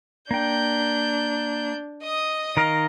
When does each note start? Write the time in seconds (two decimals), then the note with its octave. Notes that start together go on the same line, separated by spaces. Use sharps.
0.31 A#3 D4 G5 G6
2.03 D#5 D#6
2.57 D#3 A#4 D#5 F5